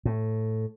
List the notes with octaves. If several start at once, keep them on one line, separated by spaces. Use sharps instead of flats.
A2